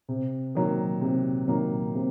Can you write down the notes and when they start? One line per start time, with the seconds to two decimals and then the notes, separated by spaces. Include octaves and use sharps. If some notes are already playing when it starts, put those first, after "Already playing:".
0.09 C3
0.55 D#3 F#3 A#3
1.01 C3
1.48 D#3 F#3 A#3
1.94 C3